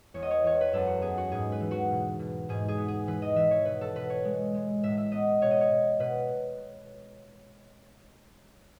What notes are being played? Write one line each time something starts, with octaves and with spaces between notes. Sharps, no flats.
E2 C#5
D#5
C#5
E2 C#5
B4
F#2 A4
F#4
B3 G#4
F#4
G#2 G#4
B4
E3
F#4
B2
B2
G#2 G#4
G#4
B3
G#4
E3 B4
D#5
E3 E5
C#5
B2 B4
A4
B2 B4
C#5
G#3
G#3
A2 E5
E5
B3 D#5
B2 C#5
D#5
C#5
B2
B2 B4